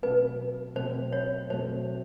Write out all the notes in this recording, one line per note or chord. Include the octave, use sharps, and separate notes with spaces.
B2 F#3 A3 C4 B4
B2 F#3 A3 C4 C5
C#5
B2 F#3 A3 C4 C5